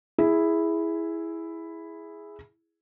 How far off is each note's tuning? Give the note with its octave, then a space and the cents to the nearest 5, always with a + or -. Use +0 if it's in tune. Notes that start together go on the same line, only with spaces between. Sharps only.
E4 +0 G#4 +0